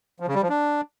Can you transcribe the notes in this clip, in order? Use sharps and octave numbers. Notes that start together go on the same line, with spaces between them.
F3
C#3
G3
F3
D4